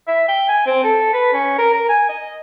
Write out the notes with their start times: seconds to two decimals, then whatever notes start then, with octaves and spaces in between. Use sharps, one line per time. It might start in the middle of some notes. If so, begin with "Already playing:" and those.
0.08 E5
0.28 G5
0.49 G#5
0.66 C4
0.84 A4
1.13 B4
1.33 C#4
1.58 A#4
1.73 A#4
1.89 G#5
2.09 D#5